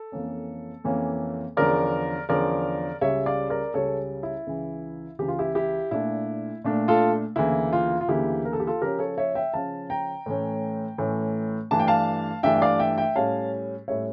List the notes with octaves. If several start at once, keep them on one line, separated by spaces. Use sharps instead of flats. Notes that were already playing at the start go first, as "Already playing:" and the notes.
Already playing: A4
F2 E3 A#3 C#4
F2 E3 A#3 C#4
E2 D3 F3 C#4 A#4 D5
E2 D3 F3 C#4 A#4 D5
C#2 C#3 G3 C#4 C#5 E5
D5 F5
A#4 D5
C#2 C#3 G3 C#4 A4 C#5
E4
C#2 C#3 E3
C#2 C#3 E3 G4
F4
E4 G4
E4 G4
A#2 A3 D4 E4
A#2 A3 D4
F4 A4
D2 C#3 E3 A#3 E4
F4
F4
D2 C#3 E3 A#3 E4 G4
A#4
A4
G4
F4 A4
C#3 F3 C#4 G4 A#4
A4 C#5
C#5 E5
E5 G5
C#3 F3 C#4 F5 A5
G5 A#5
A2 E3 A3 C#4
A2 E3 A3 C#4
G2 E3 A3 D4 A5
G5
F5 A5
G2 E3 A3 D4 E5 G5
G5
D5 F5
E5 G5
E5 G5
A2 G3 C#4 F5 A5
A2 G3 C#4 C#5 E5